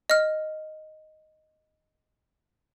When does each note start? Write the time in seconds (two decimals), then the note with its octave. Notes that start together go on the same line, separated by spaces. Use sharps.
0.10 D#5 F6